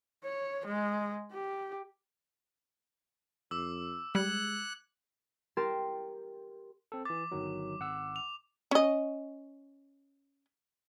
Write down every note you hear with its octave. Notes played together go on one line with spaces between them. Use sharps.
C#5
G#3
G4
F2 D6 E6
G3 G#3 F#6 G#6 C#7
G4 A#4 C6 A6 E7
C4 A4
E3 D6 A6
G1 D#3 F#3
G#1 F#5 E6
F7
C#4 D#5